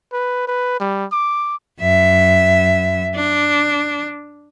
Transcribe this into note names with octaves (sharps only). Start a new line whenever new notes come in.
B4
B4
G3
D6
F#2 E5
D4